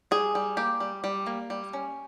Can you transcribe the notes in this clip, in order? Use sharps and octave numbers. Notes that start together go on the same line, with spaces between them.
G3 G#4
G3
A#3 G4
G3
G3
A#3
G3
C#4